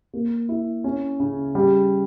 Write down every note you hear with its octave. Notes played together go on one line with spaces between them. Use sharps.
A#3
E4
C#4
C#3
G3